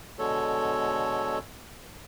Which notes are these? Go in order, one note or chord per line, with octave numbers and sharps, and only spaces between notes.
B2 D3 G#3 A4 C#5